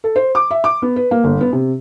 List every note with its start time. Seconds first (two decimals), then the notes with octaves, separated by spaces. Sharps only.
0.04 A4
0.16 C5
0.35 D6
0.51 E5
0.64 D6
0.82 B3
0.96 B4
1.11 A#3
1.24 G1
1.41 B3
1.52 C3